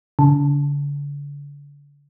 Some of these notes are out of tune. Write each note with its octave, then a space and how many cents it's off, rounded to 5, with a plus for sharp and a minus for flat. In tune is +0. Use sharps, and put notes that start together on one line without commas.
D3 -40